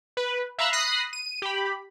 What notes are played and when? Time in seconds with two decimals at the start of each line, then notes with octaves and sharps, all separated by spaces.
0.17 B4
0.58 E5 F5 A#5 B5 E6 F#6
0.73 B5 D#6 F#6 A#6 C7
1.13 D#7
1.42 G4 B5